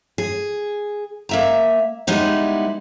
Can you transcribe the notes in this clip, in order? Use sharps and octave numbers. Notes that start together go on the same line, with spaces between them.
G#4
A#3 E5 A#5
G3 G#3 B3 D#4 E4